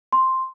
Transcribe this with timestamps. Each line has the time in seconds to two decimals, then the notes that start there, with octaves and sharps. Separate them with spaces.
0.13 C6